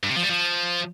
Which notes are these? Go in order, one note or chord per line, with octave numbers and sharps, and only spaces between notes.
G2
C3
F3
G3
F3